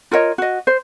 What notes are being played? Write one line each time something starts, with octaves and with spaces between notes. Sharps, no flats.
F4 A#4 C#5 D#5
F#4 D#5
C5